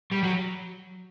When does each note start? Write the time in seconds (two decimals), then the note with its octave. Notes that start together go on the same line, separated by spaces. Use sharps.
0.12 G3
0.23 F#3